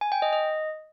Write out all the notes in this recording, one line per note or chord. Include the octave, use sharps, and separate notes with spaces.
G#5
G5
D#5
D#5